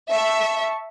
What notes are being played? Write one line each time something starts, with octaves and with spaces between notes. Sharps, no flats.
E5 A5 C#6